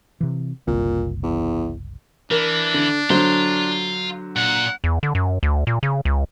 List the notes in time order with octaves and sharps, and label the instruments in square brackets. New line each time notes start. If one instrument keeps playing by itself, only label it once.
[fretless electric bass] C3 E3
[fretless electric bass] F#1 C2 [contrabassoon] A#2
[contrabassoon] E2
[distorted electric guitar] E3 [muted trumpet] D4 [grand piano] A#4
[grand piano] D3
[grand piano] D3 F#3 C5 [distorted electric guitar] F5 C6
[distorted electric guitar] A#2 [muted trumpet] F#5
[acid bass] E2
D3
F#2
D2
A#2
C#3
C#2